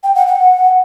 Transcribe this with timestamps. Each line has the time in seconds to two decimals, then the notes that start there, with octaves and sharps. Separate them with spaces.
0.03 G5
0.15 F#5
0.27 F#5